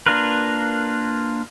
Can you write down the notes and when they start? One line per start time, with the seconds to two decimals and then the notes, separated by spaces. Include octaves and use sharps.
0.06 A#3 D4 F4 A#4 B4